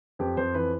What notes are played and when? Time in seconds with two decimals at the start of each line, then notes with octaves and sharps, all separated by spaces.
0.19 F2 G4
0.37 F2 C5
0.54 E3 B4